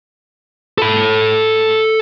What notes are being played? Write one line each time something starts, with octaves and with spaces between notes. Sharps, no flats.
A4 B5